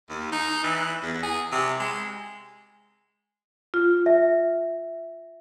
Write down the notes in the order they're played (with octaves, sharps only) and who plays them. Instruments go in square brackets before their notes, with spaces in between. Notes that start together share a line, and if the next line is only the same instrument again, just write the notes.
[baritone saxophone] D#2
D#4
E3
E2
G#4
C3
G#3
[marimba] F4
[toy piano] E5